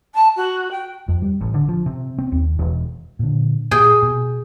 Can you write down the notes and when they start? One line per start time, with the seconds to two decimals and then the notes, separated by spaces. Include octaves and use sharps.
0.15 A5
0.37 F#4
0.71 G5
1.08 F2
1.22 G3
1.41 A1
1.54 D3
1.69 F3
1.86 C3
2.18 C4
2.32 D#2
2.59 E1
3.19 A#2 D3
3.71 A#2 G#4 G5
4.02 B2